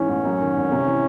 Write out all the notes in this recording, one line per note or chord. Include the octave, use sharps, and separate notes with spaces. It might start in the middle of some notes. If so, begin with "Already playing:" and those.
Already playing: G#2 E3 C#4
A1
F#2
D#3
G#1
C3
E3